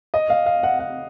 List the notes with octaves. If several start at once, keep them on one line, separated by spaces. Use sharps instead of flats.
D#5
F5
F5
F#5
F#5